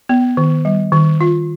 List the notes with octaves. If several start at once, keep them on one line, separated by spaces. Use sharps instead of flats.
B3
D#3
G3
D#3
F4